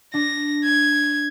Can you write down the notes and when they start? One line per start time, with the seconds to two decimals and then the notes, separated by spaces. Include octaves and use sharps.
0.14 D4 A#6
0.64 G#6